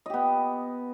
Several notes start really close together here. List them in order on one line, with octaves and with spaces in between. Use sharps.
D#5 G4 B3